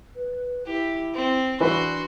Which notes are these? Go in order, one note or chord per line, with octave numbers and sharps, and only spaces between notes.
B4
E4 G4
C4
E3 D4 F#4 B4 C6